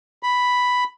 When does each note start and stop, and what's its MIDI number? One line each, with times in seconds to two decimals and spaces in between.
0.23 0.84 83